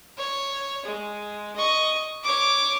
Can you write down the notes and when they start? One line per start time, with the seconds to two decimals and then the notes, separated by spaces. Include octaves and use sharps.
0.17 C#5
0.85 G#3
1.56 D#5 C#6
2.23 C#5 D6